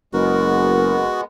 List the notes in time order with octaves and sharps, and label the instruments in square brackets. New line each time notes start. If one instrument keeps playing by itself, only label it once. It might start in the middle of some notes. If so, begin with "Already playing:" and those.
[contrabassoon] F#1 [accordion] G#3 B3 [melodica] F#4 [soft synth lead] A#4